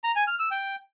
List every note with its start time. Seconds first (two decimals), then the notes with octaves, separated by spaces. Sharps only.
0.04 A#5
0.16 G#5
0.27 F6
0.39 E6
0.51 G5